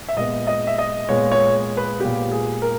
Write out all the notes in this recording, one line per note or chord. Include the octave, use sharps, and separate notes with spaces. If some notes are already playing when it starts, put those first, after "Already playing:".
E5
A#2 G#3 B3 D#5
D#5
E5
D#5
A#2 G#3 B3 C#5
C#5
B4
A#2 G#3 B3 G4
G#4
A#4